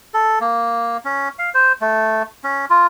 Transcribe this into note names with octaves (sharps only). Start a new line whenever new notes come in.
A4
A#3
C#4
F5
C5
A3
C#4
F4